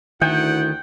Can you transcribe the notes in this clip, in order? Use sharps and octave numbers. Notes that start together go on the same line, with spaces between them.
D2 D#3 E4 F#5 G5